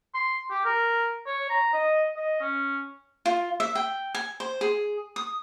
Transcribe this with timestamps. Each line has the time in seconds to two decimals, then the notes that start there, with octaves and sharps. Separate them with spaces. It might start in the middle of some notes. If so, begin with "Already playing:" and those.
0.15 C6
0.50 G4
0.65 A#4
1.27 C#5
1.50 A#5
1.73 D#5
2.17 D#5
2.41 C#4
3.26 F4
3.60 E5
3.75 G5
4.15 G#5
4.40 C5
4.61 G#4
5.16 D#6